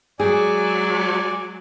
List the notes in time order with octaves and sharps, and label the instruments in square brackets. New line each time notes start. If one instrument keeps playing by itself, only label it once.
[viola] F#3 G#3 [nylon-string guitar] G#4 [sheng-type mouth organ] D5 G#5